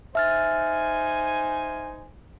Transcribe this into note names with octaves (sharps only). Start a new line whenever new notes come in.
D#4 C5 E5 G#5 F6 A6